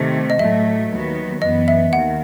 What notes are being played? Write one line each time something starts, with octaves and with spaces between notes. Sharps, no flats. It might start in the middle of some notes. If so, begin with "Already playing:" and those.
Already playing: C3 D#3 A3
D#5
A2 F#3 A3 E5
D#2 D#3 F#3 B3
F#2 E3 B3 D#5
E5
D#2 D#3 F#5